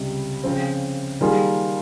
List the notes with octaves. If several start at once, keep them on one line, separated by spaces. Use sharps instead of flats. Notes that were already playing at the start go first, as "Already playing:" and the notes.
Already playing: C#2 C3 G3
C#3 F3 C4
D#3 G3 A#3 F4 G#4